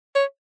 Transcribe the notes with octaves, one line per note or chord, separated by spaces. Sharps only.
C#5